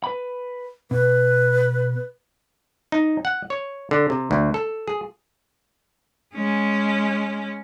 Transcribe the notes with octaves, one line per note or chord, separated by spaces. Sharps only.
B4 B5
B2 B4
D#4
F#5
C#5
D3
C3
D2
A4
G#4
G#3 C#4